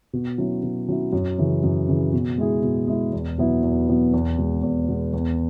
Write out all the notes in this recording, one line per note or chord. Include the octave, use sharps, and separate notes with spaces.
B2
F#3 C#4 E4
B2
F#3 C#4 E4
F#2
C#3 E3
F#2
C#3 E3
B2
G#3 E4 G#4
B2
G#3 E4 G#4
E2
B2 F#3 B3 E4
E2
B2 F#3 B3 E4
E2
B2 G#3 B3
E2
B2 G#3 B3
E2